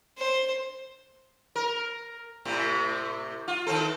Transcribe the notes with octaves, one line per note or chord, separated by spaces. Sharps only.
C5
A#4
A2 C3 C4
F4
D#3 C4 A4